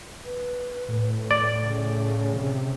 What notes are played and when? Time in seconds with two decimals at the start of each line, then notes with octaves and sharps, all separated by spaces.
0.25 B4
0.88 A2
1.31 D5
1.63 C#3
2.35 C3